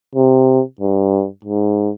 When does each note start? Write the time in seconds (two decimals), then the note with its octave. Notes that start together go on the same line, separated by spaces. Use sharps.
0.15 C3
0.81 G2
1.45 G#2